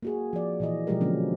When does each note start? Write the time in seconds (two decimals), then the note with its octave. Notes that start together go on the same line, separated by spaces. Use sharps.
0.03 A#3 F#4 G#4
0.33 F3 D5
0.60 A#2 E3 D#5
0.87 B2 F3 F#3 G#3 G4 A#4
1.01 D3 F3 F#3 A#3 C#4